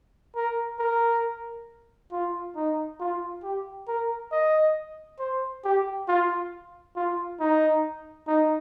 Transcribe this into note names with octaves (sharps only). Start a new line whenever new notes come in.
A#4
A#4
F4
D#4
F4
G4
A#4
D#5
C5
G4
F4
F4
D#4
D#4